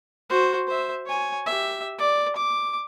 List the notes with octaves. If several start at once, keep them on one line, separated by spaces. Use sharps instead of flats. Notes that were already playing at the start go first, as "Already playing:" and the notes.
F#4 C5
C5 E5
C#5 G#5
G4 E5
D5
D6